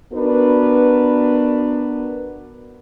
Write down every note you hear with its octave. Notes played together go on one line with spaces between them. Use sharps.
B3 D4 F#4 A#4 B4